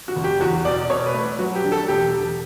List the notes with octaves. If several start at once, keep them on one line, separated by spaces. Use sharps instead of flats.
F#4
F#1
G4
E2 F#4
B2 D5
B2 C#5
B4
A3
F#3 F#4
G4
D3
A4
E1 G4
E1